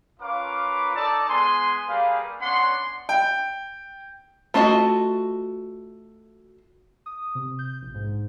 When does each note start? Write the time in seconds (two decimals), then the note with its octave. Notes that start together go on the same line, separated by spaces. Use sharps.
0.20 C#4 F4 A#4 B4 F5 D6
0.95 D#4 A4 D5 A5 A#5
1.29 G#3 B3 G#5 C6
1.88 G3 A#3 G#4 B4 F5
2.41 B3 C#4 D4 F#5 C6
3.09 G5
4.54 A3 F4 F#4 D#5 A5
7.06 D#6
7.35 C3
7.59 G6
7.82 A#1
7.95 G#2